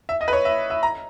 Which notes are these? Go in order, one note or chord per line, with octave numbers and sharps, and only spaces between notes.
E5
D#5
B4
C#5
E5
E5
A#5